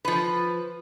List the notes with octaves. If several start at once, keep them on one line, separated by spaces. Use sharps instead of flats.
F3 B4